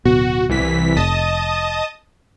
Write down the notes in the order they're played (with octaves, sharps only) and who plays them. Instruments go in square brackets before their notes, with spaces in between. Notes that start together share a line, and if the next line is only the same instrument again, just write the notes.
[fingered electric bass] D1 B2 [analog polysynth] F#4
[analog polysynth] C2 E3 B6
[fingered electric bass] F1 [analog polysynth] D#5 A5 D#6